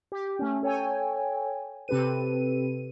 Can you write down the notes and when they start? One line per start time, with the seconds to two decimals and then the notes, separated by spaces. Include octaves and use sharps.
0.12 G4
0.39 A3 C#4
0.63 A4 C#5 G5 G#5
1.88 C3 C4 G4 A4 B4 D#7